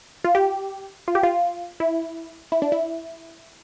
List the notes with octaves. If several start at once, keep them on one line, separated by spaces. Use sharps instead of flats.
F4
G4
F4
G4
F4
E4
E4
D4
E4